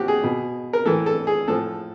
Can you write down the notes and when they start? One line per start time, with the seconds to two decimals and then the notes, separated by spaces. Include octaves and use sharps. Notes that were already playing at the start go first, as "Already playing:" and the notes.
Already playing: A#2 F3 F#4 G4
0.08 G#4
0.24 B2
0.73 A#4
0.86 A2 E3 A4
1.06 A4
1.27 G#4
1.48 A2 F3 A4